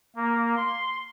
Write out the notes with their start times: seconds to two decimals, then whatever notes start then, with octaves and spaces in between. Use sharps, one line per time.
0.16 A#3
0.57 C6